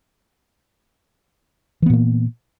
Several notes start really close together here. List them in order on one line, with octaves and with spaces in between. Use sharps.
E3 B3 A#2 A#3